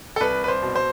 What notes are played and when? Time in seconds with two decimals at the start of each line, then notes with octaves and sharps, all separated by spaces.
0.16 A4
0.20 C2 B4
0.44 B4
0.48 C5
0.63 B2
0.75 C5